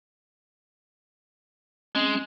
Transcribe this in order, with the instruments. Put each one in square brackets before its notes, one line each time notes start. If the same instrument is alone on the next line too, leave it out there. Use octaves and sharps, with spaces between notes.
[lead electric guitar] G#3 [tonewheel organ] C4 C#4